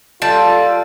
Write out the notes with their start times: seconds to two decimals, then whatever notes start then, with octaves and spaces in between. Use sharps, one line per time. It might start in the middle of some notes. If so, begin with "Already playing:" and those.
0.22 G3 F4 A4 A5